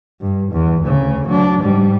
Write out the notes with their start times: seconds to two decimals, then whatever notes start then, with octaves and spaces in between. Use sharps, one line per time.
0.21 G2
0.52 E2
0.82 D2 C#3
1.28 F#3 D4
1.60 G#2 G3